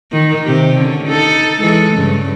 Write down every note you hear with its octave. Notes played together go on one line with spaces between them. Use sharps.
D#3
C3 G4
D3 C#4
D#4 A4
E3 G#3 A4
G2 C#3